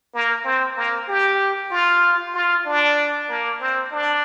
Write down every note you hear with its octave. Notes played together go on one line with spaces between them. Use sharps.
A#3
C4
A#3
G4
F4
F4
D4
A#3
C4
D4